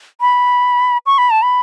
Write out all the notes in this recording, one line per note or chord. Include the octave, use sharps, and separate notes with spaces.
B5
C#6
B5
A5
B5